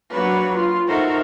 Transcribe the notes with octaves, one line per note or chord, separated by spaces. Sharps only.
F#3 A#3 D4 F#4 B4 C#5
F4 C6
D#4 F#4 A4 A#4 C5 E5